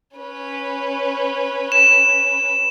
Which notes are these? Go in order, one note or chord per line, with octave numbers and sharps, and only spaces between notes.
C#4 B4
E7